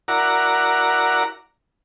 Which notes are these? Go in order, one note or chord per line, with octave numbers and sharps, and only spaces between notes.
E4 F#4 A#4 D5 F#5 A#5